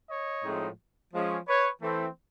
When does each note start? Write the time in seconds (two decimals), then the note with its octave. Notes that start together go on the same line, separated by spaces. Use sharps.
0.09 C#5 D#5
0.43 A2 F3 G#3 C4 D#4
1.13 F3 G#3 C#4
1.48 B4 C#5
1.82 E3 A3 C4